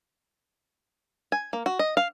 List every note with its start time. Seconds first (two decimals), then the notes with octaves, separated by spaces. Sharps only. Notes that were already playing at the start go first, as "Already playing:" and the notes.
1.32 G#5
1.53 A#3
1.66 F#4
1.79 D#5
1.97 F5